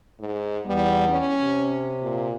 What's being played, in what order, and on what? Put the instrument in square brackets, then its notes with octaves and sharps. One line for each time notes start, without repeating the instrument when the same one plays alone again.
[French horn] G#2
[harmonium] E2 B3 [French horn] G3
[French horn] C#4
[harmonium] C3
[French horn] A#2